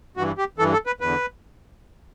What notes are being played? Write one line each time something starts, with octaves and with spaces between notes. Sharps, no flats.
G2 E3 F#4
G4
G2 E3 A4
A4
B4
E2 D3 B4